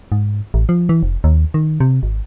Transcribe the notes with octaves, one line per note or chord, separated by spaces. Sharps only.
G#2
A1
F3
E3
F1
D#2
D#3
C3
G#1